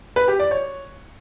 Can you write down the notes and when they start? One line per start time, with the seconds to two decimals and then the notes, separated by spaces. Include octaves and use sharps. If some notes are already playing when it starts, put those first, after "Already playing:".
0.16 B4
0.28 G4
0.39 D5
0.51 C#5